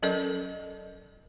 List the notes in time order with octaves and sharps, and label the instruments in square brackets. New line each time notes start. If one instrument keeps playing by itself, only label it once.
[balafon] F#3 C#4 A4 A#4 D5 D#5